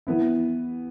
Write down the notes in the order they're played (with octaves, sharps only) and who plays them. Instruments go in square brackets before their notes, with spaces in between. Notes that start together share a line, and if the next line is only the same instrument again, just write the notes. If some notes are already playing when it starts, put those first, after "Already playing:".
[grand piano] E3 B3 E4